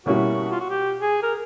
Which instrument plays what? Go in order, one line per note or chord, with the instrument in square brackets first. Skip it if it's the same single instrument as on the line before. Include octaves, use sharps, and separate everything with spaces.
[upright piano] B2 G3 A#3 C#4 E4 [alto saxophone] F#4
[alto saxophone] F4
F#4
G4
G#4
A#4